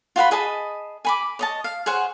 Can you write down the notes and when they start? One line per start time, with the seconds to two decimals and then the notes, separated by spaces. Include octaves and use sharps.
0.16 F4 F#4 B4 B5
0.31 G#4 D#5 A5 B5
1.05 G#5 B5 D6
1.39 C#5 D#5 A5
1.64 F5
1.86 G#4 C5 C#5 F#5